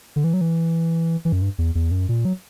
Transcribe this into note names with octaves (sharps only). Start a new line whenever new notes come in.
D3
E3
F#3
E3
E3
F#2
G2
E2
E2
F#2
A#2
F#3